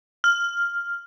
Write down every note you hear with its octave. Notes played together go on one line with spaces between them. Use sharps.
F6